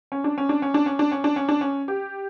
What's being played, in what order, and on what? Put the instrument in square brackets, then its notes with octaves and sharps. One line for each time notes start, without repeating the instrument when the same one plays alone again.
[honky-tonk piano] C#4
D4
C#4
D4
C#4
D4
C#4
D4
C#4
D4
C#4
D4
C#4
G4